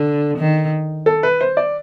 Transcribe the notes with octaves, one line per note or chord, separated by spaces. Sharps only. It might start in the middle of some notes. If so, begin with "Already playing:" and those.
Already playing: D3
D#3
A4
B4
C5
D5